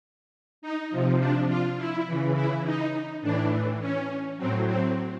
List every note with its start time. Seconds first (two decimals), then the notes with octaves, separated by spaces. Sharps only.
0.62 D#4
0.91 C3 F3
1.19 D4
1.48 F4
1.77 E4
2.07 C#3 E3
2.35 E4
2.65 D#4
3.22 A2 E3 D4
3.80 C#4
4.37 A2 F#3 C4
4.67 C4